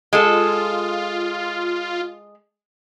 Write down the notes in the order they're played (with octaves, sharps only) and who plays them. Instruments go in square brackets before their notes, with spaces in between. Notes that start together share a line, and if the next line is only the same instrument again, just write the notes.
[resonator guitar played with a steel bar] G#3 A4 [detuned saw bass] F4